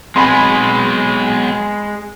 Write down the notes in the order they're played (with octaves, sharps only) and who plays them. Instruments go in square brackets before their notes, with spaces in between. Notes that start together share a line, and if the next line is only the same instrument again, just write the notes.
[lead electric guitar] F#3 B3 [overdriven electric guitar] G#3 [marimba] C4 [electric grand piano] G#5 B5 C6